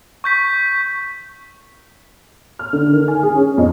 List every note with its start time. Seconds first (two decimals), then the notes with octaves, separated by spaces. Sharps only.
0.24 C#6 G6 B6
2.59 F6
2.73 D3
2.93 D#3
3.08 G#5
3.23 G#4
3.35 C#4
3.57 F2